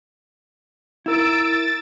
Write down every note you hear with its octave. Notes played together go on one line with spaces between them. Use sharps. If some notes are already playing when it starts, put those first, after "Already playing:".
E4 A#4 E6 A6 D7
A6